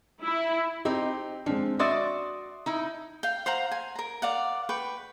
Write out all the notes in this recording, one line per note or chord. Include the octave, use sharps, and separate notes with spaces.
E4
C4 D#4 G4
F3 G#3 C4 D4
F#4 D5 E5 C6 D#6 A6
D#4 E4
F5 G5
C5 F5 F#5 A#5
G#5
A#4 A#5
D5 F5 F#5
B4 G5 C#6